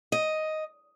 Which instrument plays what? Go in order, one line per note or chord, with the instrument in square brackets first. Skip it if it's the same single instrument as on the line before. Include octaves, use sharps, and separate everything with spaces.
[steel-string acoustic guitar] D#5